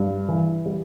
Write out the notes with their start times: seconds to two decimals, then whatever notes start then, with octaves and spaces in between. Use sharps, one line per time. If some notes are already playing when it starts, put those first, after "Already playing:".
Already playing: G2
0.29 E3
0.66 G3